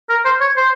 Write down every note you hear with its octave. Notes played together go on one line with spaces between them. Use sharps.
A#4
C5
C#5
C5